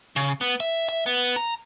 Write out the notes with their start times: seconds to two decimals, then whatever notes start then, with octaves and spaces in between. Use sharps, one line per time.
0.16 C#3
0.41 B3
0.60 E5
0.89 E5
1.06 B3
1.36 A#5